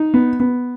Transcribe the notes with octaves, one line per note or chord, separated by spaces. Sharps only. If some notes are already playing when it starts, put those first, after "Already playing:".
Already playing: D#4
B3
B3